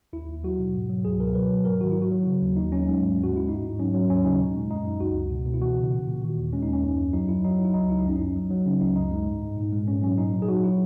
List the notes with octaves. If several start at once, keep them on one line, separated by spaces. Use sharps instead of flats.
D#2 E4
D#2
F#3 F#4
B2
G#2
F#3
C#2 G#4
B2 A#4
F#3 B4
F#3
G#2 A#4
D#3 F#4
E4
F#3
F#4
F#3
C#3
D#2
D#2 D#4
F#3 C#4
G#3
G#2
D#2 F#4
G#3 E4
G#2 D#4
G#2
F#3 C#4
F#3
D#2 C#4
C#3 D#4
A#2
G#3
F#2 D#4
F#2
C#2 F#4
C#2
B2
B2
E4
E3 F#4
C#3
A#2
A#2
D#3
D#2
G#3 C#4
D#2 D#4
C#4
F#2
F#2
F#3 D#4
F#2 E4
F#3 D#4
F#3
E4
C#2 D#4
C#2 E4
D#4
F#2 C#4
F#2 D#4
F#3
F#3
C#3 C#4
C#2 D#4
F#2 D#4
G#3
G#2
G#2
A#2
G#3
G#2 C#4
F#3 C#4
A#2 D#4
F#3
G#4
F#3 F#4
F#3 E4